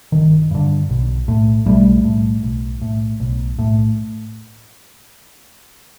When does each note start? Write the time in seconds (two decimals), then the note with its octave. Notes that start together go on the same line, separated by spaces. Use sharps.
0.12 G1 D#3
0.51 G2 D3
0.90 B1
1.28 A2
1.66 B1 G3 A3
2.04 A2
2.43 B1
2.82 A2
3.20 B1
3.59 A2